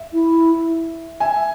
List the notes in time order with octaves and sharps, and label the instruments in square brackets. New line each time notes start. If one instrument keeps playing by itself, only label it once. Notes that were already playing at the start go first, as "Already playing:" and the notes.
Already playing: [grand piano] E5
[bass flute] E4
[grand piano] E5 G#5